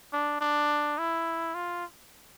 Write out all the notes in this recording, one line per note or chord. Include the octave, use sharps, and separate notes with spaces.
D4
D4
E4
F4